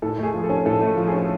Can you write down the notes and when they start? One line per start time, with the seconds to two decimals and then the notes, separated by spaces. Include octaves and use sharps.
0.02 A2 A4
0.18 A3 G#4
0.34 F3
0.44 A4
0.50 C#4
0.66 A2 A4
0.81 A3
0.97 F3
1.07 G#4
1.12 C#4